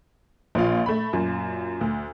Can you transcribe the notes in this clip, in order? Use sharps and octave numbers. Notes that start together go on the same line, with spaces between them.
A#1 F3 F5
A3 B5
F#2 A#2
D2